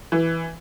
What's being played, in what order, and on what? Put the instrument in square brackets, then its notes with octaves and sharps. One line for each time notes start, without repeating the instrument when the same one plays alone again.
[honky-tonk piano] E3